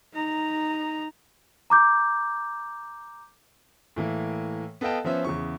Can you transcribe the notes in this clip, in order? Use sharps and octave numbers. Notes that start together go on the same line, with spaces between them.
D#4 A#5
A#5 D6 G6
A2 E3 A#3
B3 A4 D#5 F5 G5 A5
F3 B3 C#4 C5 E5
E2 C#3 C#6